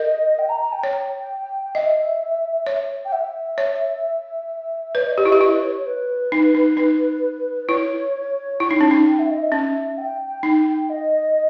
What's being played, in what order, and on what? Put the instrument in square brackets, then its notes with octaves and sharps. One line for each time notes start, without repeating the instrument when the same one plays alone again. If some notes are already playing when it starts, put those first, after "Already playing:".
Already playing: [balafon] A#4 [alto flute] D#5
[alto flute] G5
A#5
A#5
G5
[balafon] C#5
[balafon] D#5 [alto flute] E5
[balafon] C#5
[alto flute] G5
E5
[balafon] C#5
[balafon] B4 [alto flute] C#5
[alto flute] D#5
C#5
[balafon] G4 [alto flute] D#5
[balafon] E4
[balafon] G4 [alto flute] E5
[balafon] E4 [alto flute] D#5
[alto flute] B4
C#5
C#5
B4
[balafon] D#4
D#4
D#4
[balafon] E4 [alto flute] C#5
[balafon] E4
D#4
C#4
D#4
[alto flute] G5
E5
D#5
E5
[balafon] C#4
[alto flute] G5
[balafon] D#4
[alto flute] D#5